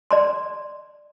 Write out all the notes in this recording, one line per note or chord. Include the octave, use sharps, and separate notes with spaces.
D5 A#5 C6